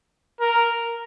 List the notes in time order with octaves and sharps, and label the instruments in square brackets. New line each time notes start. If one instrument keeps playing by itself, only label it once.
[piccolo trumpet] A#4